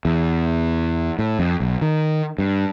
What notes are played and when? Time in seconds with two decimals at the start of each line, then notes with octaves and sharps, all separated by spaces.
0.05 E2
1.19 A2
1.39 F2
1.60 B1
1.82 D#3
2.38 G2